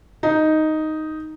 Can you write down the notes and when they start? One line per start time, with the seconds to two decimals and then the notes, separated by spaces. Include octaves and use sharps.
0.23 D#4